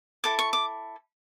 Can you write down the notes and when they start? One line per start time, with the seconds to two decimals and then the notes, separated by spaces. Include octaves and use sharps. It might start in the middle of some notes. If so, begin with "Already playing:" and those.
0.24 E4 A4 D6
0.39 C#6
0.53 D6